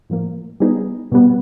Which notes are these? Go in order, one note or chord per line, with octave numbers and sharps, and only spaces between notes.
A2 F3 A#3
G3 B3 D#4 G#4
B2 G3 B3